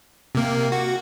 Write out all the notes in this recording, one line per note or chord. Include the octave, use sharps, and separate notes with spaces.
C3 A#3
F#4